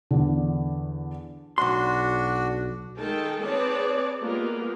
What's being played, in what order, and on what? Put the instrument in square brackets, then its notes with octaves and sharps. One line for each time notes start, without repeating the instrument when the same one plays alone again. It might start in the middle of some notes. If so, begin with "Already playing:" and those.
[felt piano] E2 D3
[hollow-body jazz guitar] B1 C6 [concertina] D4 F#4
[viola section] D#3 G#3 A4 G5 A5
C4 G#4 B4 C#5 D5 A5
G#3 A#3 B3 F4 G4 A#4